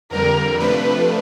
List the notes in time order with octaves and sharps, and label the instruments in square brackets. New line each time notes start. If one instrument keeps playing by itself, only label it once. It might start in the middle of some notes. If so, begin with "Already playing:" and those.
[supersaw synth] F2 D3 G3 [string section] A#4
[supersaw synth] C3 F3 A3 D4 [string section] B4